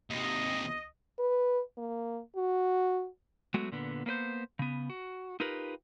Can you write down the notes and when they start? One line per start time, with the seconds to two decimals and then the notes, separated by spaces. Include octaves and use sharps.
0.10 D#2 C3 D#5
1.19 B4
1.77 A#3
2.36 F#4
3.54 F#3 G#3 A3 B3 F#4
3.72 A#2 D3 B3
4.06 A#3 B3 B4 C5
4.59 C#3 B3
4.90 F#4
5.40 D#4 F4 G4 A#4 B4